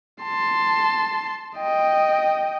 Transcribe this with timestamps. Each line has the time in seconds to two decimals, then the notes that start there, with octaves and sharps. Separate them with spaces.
0.23 A5 C6
1.57 D#5 G5